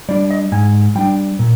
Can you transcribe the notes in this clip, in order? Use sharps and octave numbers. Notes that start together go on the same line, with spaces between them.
G3 D4 D5
D#5
G#2 G#5
G3 D4 G5
A#2